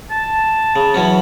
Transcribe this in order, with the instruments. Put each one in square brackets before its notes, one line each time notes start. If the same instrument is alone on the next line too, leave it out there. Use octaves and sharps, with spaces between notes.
[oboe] A5
[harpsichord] C#3
E3 F#3 C#4